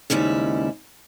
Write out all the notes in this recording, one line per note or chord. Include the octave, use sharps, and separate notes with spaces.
D#2 G#2 C#3 G3 E4